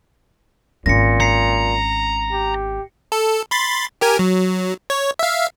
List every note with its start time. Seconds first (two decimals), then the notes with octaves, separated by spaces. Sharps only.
0.86 G#1 A#2 C#4 A#6 C#7
1.20 A#5 C7 C#7
2.32 G4
3.12 A4
3.51 B5 C6 A6
4.01 G4 A#4 G#5
4.19 F#3
4.90 C#5
5.19 E5 F5